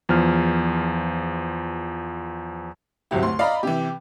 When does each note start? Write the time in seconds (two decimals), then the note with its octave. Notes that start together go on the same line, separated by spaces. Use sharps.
0.09 E2 F3 F6
3.11 G1 C2 F#3 E4 G4
3.23 D2 C6
3.39 D5 D#5 F5 A#5 B5
3.63 C3 E3 G4